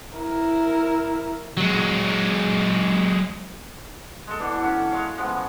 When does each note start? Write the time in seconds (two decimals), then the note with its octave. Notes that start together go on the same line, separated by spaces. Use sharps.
0.17 E4 A#4
1.57 F#3 G#3
4.27 G#3 A4
4.39 B2 E3 D4
4.61 C#4 A4 F#5
4.91 G#3 C#5 F5
5.17 F3 F#3 G#3 B3